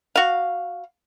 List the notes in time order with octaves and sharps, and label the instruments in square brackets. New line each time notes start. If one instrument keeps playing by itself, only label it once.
[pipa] F#4 F5